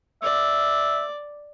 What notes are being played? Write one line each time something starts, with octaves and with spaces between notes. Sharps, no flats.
D5 E5